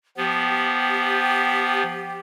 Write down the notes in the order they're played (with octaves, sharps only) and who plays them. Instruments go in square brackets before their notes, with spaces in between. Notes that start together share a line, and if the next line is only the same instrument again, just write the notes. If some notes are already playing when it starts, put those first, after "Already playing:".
[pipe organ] F3 B3 [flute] G4